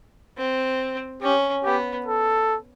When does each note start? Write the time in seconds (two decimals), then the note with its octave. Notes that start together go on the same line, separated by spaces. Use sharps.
0.38 C4
1.21 C#4 G4
1.64 B3 G4
2.06 A4